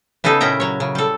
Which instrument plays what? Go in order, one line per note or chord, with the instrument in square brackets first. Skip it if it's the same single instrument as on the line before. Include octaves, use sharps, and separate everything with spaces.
[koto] C#3 B3 D#4 G#4 A4
A#2 C#4 E4 G5 A#5
F#3 C#5
C#3
G3 A4